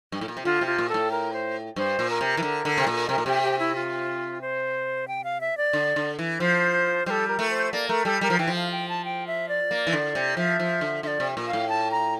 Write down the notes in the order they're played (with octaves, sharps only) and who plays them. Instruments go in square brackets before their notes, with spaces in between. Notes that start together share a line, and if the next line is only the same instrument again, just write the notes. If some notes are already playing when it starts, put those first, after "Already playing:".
[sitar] G2
A2
A#2
C3
[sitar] D3 [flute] F4
[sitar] C3
[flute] F4
[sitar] A#2
[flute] A4
[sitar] A2
[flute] A#4
C5
[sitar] G2 [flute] C5
[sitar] A#2
[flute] A#4
[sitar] C3
E3
D3
D3
C3
A#2
[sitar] C3 [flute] A#4
[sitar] A#2
[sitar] C3 [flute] G4
[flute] G4
E4
F4
C5
G5
F5
E5
D5
[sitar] D3
D3
E3
[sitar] F3 [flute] C5
[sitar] G3 [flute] A4 C5
[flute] A#4
[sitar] A3
[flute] C5
[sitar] A#3 [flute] D5
[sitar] A3 [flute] A#4
[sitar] G3 [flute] A4
[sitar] G3 [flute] A#4
[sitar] F3
[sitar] E3 [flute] G5
[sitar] F3
[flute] F5
G5
A5
G5
E5
D5
[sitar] A#3
E3
D3
C3
[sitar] F3 [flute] E5
[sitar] F3
D3
[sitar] D3 [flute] E5
[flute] D5
[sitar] C3
A#2
[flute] F5
[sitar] A2
[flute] A5
A#5